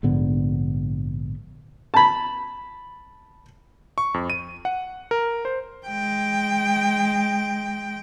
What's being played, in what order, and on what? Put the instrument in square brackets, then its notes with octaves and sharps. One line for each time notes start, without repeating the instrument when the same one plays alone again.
[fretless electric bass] A#1 G#2 D3 B3
[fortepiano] A5 B5
[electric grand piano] C#6
F2
D#7
F#5
A#4
C5
[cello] G#3 G5